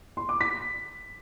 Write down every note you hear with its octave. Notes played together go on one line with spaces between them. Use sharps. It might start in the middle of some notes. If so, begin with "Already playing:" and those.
C6
D6
B6